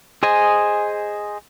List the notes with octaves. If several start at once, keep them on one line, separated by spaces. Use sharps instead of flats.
G#4 C5 D#5 G#5